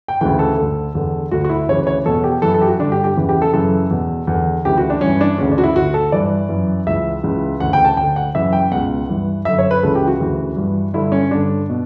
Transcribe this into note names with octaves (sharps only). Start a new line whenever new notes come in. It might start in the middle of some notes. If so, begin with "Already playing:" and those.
G5
D2 C#3 E3 G5
A4
D2 D3
E2 D3
D2 D3 F#4
F#4
E4
D2 C#3 E3 C#5
C#5
E2 B2 A4
G4
F#2 E3 A4
A4
G4
F#4
G2 D3 D4
G4
G4
E2 C#3 E3
G4
A4
F#2 C#3 E3 A4
E2 B2
E2 D3
D2 C#3 E3 G4
F#4
D4
G2 E3 C#4
D4
D2 C#3 E3 C#4
D4
F#4
E4
D2 D3 F#4
A4
G2 E3 D5
F#2 E3
C#2 C#3 E3 E5
C#2 C#3 E3
D2 C#3 E3 F#5
G5
A5
D2 D3 G5
F#5
F#2 C#3 E3 E5
G5
C#2 B2 F#5
G2 E3
F#2 D3 E5
C#5
B4
C#2 C#3 E3 A4
G4
F#4
D2 C#3 E3
G2 E3
G2 D3 E4
C#4
G2 D3 D4
B2